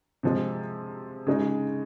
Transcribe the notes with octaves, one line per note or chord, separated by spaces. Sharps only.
C3 F3 G#3
C#3 G#3 D#4